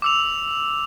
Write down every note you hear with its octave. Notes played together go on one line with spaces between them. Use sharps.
D6 E6 F7